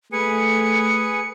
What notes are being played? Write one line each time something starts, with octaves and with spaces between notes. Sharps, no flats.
A3 G#4 B4 G#5 C#7